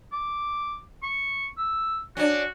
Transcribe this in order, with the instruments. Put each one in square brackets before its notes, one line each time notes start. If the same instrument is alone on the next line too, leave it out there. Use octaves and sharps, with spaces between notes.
[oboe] D6
C#6
E6
[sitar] C#4 D4 [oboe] F#4